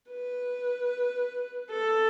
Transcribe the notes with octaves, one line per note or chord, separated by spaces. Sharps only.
B4
A4